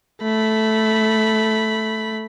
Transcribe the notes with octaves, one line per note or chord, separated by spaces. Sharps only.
A3 B5